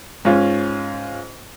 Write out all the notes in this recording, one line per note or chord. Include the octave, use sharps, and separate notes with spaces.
G#2 C#4 F4